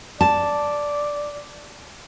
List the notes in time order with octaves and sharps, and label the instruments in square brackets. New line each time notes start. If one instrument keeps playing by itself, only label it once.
[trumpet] D5 [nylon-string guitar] A5